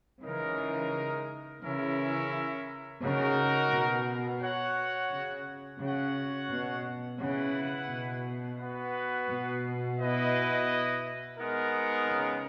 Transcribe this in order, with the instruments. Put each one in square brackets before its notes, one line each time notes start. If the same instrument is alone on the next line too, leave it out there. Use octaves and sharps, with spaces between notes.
[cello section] C#3 E3 [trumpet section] G#3 D#4 A#4
[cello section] C#3 E3 [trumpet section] C#4 E4 A#4 E5
[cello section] C#3 [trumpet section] D#4 F#4 A#4
[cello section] B2
[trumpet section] F#4 C#5 F#5
[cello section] C#3
[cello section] C#3 [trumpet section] F#4 C#5 F#5
[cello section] B2
[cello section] C#3 [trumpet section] E4 B4 F#5
[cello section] B2
[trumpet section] B3 F#4 B4
[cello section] B2
[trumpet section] E4 B4 D#5
G#3 B3 D#4 A#4
[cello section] C#3